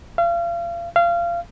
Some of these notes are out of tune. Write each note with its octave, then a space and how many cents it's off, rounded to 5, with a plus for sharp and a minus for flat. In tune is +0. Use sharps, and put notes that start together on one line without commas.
F5 -35
F5 -25